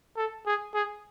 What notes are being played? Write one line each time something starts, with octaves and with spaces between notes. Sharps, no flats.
A4
G#4
G#4